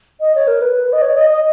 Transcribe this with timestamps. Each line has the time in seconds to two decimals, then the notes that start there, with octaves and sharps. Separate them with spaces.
0.20 D#5
0.35 C#5
0.48 A#4
0.62 B4
0.93 D#5
1.02 C#5
1.16 D#5
1.30 D#5